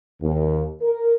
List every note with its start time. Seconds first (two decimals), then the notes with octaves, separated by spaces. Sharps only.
0.22 D#2
0.82 A#4